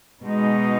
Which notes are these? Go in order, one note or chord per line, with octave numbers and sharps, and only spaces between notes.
B2 G#3 D#4